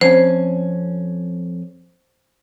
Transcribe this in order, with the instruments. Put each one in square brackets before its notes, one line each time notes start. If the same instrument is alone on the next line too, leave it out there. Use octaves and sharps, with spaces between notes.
[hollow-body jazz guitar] F2 C#4 [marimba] C5